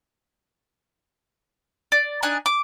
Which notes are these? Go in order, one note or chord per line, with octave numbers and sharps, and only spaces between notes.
D5
D4 D#4 G#5 F#6
D6